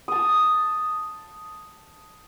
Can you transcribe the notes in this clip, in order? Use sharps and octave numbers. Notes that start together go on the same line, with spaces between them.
A5 D#6